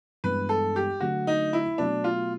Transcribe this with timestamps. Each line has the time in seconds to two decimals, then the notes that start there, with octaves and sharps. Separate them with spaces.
0.24 G2 E3 G#3 B3 B4
0.49 A4
0.76 G4
1.00 D3 F#3 A3 F#4
1.27 D#4
1.53 E4
1.78 B2 F#3 A3 D4
2.04 F4